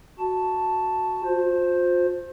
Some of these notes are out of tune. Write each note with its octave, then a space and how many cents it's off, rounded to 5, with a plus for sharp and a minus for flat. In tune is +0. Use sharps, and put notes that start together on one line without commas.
F#4 +0 A5 +0
F4 +35 C5 +0